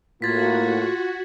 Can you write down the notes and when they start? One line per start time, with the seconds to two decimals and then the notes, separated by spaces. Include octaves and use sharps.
0.22 A2 A#3 F4 F#4 G#6 A6 B6